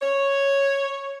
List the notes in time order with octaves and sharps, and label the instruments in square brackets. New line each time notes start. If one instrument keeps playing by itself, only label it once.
[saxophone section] C#5